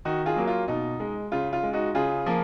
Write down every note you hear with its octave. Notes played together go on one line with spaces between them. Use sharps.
D#3 D#4 F#4
F4 G#4
F#3 A#3
F4
B2 D#4
G#3
C#3 F4
F4
G#3
D#4 F#4
C#3 F4 G#4
F3 A#3